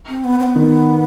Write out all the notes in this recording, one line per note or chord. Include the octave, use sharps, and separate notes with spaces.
C4
B3
C4
B3
D#3